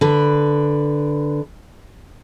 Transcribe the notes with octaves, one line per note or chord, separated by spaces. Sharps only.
D3 B4